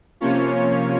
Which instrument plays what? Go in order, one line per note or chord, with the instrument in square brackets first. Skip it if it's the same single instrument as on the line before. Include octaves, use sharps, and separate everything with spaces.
[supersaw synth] C3 F3 A#3 C#4 F4 C#5